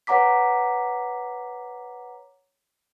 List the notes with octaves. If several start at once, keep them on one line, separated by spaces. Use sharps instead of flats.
B4 C#5 F#5 A#5 D6 B6